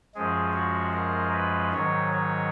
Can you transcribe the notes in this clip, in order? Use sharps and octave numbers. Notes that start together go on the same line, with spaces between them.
F#2 F3 G#3 G#4
F#4
A#4
B4
G#2 D#3 F#3 C#5
C#5